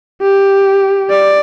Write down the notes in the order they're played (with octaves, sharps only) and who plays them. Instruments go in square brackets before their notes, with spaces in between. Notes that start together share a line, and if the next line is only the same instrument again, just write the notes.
[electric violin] G4
D5